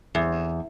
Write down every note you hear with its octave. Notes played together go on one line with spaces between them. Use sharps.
E2